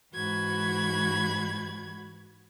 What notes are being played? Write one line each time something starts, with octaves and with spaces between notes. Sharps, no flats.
G#2 E3 F#4 B5 G#6